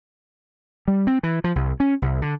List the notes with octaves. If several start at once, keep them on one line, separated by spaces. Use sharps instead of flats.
G3
C4
E3
F3
C2
C#4
C2
D3